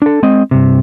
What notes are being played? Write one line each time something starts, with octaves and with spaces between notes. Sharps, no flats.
D4 A4
G#3 C4 D#5
G2 C3